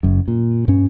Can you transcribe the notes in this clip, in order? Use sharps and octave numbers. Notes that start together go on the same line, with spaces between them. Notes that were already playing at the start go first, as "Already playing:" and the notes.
F#1 F#2
A#2
G2 C#4